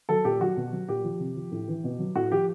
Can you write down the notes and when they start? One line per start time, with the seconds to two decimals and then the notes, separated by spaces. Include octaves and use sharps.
0.09 F#3 A4
0.25 A#2 G4
0.41 F#3 F#4
0.57 B2
0.73 F#3
0.88 A#2 G4
1.05 F3
1.20 C3
1.36 F3
1.52 A2
1.68 E3
1.84 B2
1.99 F#3
2.15 A2 F#4
2.32 F3 G4